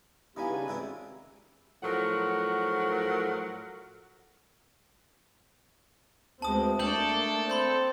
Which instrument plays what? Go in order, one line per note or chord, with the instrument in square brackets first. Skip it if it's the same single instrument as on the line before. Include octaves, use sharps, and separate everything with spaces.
[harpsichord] E3 G3 F5 [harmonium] B3 E4 G4 [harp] D#4 G#5
[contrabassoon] C#3 [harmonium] D4 B4
[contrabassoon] G#1 [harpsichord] C3 E4 G5
[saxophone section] A2 F3 F#3 A#4 F#5
[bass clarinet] D2 [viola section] G#3 B3 C4 [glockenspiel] A5 D#6
[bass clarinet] A3 [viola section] A#3 D4 D5 [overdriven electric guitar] A4 [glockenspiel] G6 F#7
[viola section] C4 [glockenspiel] B5 C6 G6